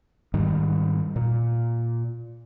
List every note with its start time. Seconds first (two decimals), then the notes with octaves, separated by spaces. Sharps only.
0.34 G#2 D#3 G3
1.16 A#2